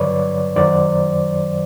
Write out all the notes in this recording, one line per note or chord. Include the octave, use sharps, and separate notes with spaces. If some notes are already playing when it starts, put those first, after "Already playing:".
Already playing: G2 D3 F#3 B4 C#5 D5
F#2 D#3 F#3 C5 D5